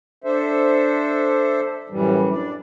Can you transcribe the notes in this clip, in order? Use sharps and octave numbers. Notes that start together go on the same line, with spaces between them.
D4 A4 C5 E5
F#2 A2 E3 G3
D4 D5